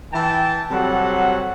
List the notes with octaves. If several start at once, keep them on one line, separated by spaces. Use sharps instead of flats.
E3 G5 A5
C3 F#3 G3 C4 A4 F#5